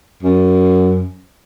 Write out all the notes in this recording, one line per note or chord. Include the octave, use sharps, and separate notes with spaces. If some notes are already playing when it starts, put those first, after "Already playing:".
F#2